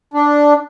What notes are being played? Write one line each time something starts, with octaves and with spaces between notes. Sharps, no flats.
D4